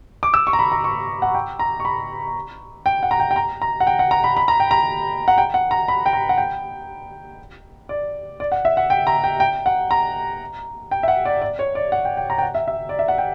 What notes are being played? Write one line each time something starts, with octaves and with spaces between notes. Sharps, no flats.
D6
E6
C#6
A#5
B5
A#5
C#6
F#5
G5
A#5
C#6
B5
G5
F#5
A#5
G5
G5
A#5
A#5
F#5
G5
F#5
A#5
B5
B5
A#5
G5
A#5
F#5
G5
F#5
A#5
B5
G5
A#5
F#5
G5
D5
D5
F#5
E5
F#5
G5
A#5
G5
G5
F#5
A#5
G5
E5
F#5
D5
D5
C#5
D5
F#5
G5
G5
A#5
G5
F#5
E5
E5
D5
E5
F#5
G5